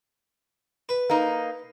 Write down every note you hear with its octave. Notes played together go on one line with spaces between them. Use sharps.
B4
A#3 D#4